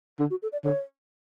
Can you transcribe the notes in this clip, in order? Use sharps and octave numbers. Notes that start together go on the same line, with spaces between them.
D3 D4
F#4
A4
D5
D3 C#5